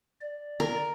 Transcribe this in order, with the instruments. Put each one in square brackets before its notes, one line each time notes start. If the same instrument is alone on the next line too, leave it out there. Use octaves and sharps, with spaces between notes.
[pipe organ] D5
[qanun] A#4